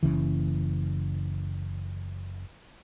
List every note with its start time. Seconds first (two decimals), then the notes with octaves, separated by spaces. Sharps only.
0.03 F#1 C#2 C#3 E3